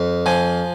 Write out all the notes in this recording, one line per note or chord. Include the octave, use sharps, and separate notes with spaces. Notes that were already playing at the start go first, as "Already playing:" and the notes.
Already playing: F2
F3 G#5